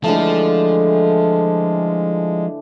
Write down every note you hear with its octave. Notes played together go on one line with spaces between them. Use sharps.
D3 E3 F3 G#3 A3